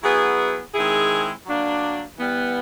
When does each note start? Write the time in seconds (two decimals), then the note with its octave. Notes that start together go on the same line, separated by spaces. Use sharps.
0.02 F#3 B3 E4 G#4
0.74 D#3 G#3 C4 E4 G#4
1.45 F#3 A#3 D4
2.16 E3 G3 B3